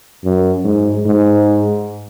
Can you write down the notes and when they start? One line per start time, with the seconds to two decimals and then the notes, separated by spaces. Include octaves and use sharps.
0.24 F#2
0.64 G#2
1.06 G#2